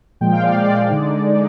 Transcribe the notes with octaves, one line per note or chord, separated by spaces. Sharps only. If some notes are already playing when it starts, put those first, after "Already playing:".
A#2 F3 G#3 G5
F5
D5
A#2 F3 G#3 D5
D3 G#3 D#4
D3 G#3 D#4